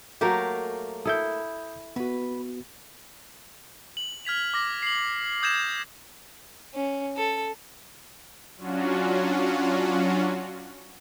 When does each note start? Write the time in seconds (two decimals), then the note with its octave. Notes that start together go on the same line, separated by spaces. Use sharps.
0.21 F#3 A3 A#3 G4 A#4
1.06 E4 A4 D#6 G6
1.96 B3 F#4 B4
3.97 F#7
4.25 F6 G#6 B6 F7
4.54 D6 A#6
4.82 C7 F#7
5.43 D#6 G6 G#6 A#6 E7
6.75 C#4
7.17 A4
8.57 F#3 C#4 D4 F4 F#4